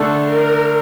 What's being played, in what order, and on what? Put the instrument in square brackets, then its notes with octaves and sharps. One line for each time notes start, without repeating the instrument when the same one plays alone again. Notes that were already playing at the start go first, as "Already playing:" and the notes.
Already playing: [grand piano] D3 A3 D4 [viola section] A4
[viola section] A#4